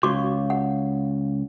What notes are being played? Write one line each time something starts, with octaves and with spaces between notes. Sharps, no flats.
C#2 F#4 C#6 D6
F#5